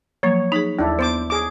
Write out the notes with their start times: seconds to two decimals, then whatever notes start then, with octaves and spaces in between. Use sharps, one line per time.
0.23 F3 F#3 A#3 C#5
0.52 D#4 G#4 B5
0.79 D#2 D4 E4
0.99 B3 C5 D6 A6
1.30 G#4 D6